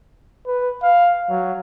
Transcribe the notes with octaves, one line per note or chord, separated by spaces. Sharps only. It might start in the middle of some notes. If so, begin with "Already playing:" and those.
B4
F5
F#3